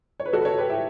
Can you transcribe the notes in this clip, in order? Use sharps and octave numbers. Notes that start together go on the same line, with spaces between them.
C#5
B4
F#4 A4
B4
A4 C#5
G4 B4
E4 G4